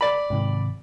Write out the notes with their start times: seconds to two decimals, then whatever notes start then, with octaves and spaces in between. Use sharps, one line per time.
0.01 D5 B5
0.30 G#2 C3 D#3